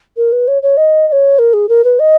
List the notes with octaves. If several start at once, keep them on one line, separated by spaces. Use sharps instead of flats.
A#4
B4
C#5
C#5
D#5
D#5
C#5
A#4
G#4
A#4
B4
D#5